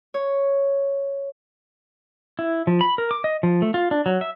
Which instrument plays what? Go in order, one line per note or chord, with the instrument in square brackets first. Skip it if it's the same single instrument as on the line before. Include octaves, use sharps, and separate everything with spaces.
[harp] C#5
[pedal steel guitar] E4
F3
B5
A#4
D6
D#5
F3
A3
F4
D4
F#3
E5